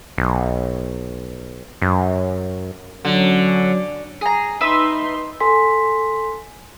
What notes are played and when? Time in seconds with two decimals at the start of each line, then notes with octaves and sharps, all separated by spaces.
0.18 B1
1.82 F#2
3.05 D3 F#3 C#4
4.21 G#4 A#5
4.61 D#4 B4 E5 C6 E6
5.40 A4 G#5 C6 B6